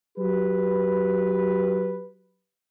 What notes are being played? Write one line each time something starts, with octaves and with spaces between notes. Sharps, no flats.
F#3 G4 B4